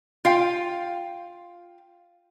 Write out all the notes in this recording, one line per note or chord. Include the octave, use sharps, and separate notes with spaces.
F4 F5 G5